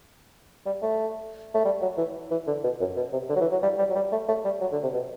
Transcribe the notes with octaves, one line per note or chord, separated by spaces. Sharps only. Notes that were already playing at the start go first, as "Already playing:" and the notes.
G3
A3
A3
G3
F#3
E3
E3
D3
B2
F#2
B2
C3
D3
F#3
E3
F#3
G3
G3
F#3
G3
A3
A3
G3
F#3
D3
C3
B2